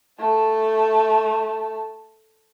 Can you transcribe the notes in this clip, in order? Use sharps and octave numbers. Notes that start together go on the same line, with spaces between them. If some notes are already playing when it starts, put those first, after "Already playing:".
A3 A5